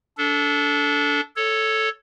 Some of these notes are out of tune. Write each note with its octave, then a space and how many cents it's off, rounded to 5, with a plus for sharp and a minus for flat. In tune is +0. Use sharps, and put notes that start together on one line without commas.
D4 -25 A4 +0
A4 +0 C#5 +0